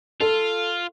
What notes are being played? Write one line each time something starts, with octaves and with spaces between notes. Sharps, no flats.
F4 A4